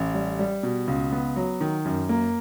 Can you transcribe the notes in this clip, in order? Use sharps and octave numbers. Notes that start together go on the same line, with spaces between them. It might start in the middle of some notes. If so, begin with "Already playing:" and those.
Already playing: A1
G3
G3
B2
C#2
B3
F#3
D#3
F#2
A#3